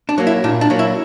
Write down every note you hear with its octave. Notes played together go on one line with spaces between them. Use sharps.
D4
F#3 A#3
E4
A#2 D4
D4
F#3 A#3
E4